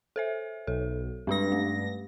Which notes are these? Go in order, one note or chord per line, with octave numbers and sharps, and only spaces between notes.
A4 C5 E5
B1 A4
G2 G#3 D4 G4 A#6
A3